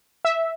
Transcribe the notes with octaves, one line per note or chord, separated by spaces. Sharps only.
E5